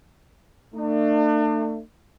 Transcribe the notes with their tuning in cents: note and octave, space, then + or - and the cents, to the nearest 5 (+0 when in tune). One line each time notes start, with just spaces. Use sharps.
A3 +35 D4 +40